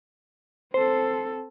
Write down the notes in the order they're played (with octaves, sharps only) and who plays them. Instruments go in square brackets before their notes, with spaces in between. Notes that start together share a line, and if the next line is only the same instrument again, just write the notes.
[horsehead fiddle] C4 A4 [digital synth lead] C5